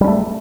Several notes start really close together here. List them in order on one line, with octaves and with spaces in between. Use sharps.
G3 C#4 A3